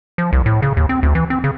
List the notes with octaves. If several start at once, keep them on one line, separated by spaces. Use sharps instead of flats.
F3
C2
A2
C#3
D#2
C4
D2
E3
C4
C#3